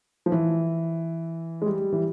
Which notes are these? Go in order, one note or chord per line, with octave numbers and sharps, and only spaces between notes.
F3
E3
G#3
G3
E3